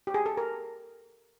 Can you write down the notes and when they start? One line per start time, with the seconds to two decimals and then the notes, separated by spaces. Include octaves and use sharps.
0.07 G4
0.14 G#4
0.26 A4
0.37 A#4